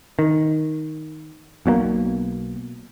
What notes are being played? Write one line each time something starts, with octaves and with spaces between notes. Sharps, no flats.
D#3
B1 B2 F#3 A#3